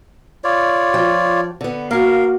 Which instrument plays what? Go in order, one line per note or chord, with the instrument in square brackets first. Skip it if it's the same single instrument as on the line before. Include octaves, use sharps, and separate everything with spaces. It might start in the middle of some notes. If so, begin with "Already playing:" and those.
[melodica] F4 C#5 D5
[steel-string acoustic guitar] F3 G5
D3 B3
[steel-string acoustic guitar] A#3 F#4 [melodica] A#4 F5